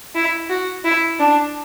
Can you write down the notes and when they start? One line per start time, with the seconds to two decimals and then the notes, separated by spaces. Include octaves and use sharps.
0.15 E4
0.50 F#4
0.84 E4
1.19 D4